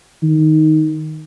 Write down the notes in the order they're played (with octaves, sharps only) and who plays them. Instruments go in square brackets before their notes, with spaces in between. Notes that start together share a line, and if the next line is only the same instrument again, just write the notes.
[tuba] D#3